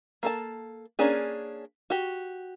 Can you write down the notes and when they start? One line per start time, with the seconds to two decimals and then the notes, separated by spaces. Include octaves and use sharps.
0.23 A#3 A4 A5
0.99 A#3 C#4 D4 G#4
1.90 F#4 G4